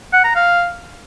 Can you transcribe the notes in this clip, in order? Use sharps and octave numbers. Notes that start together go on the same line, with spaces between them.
F#5
A#5
F5